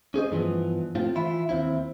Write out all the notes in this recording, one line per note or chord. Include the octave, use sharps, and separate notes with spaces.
C#4 G#4 C5 D#5
G2 E3 F3 B3
A2 C4 F4
E3 E4 F4
D#2 C4 E4